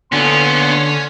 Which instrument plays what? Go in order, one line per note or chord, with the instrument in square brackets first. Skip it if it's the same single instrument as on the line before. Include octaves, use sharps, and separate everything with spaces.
[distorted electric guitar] A#2 B3 [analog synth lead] D3 [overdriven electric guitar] C#4 [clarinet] C6